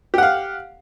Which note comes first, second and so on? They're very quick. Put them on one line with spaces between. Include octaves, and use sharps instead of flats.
G4 F#5 F5